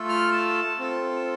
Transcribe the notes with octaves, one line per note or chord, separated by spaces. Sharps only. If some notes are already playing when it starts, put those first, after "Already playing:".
Already playing: A3 F4 A4
F6
A5
C4 F4 A4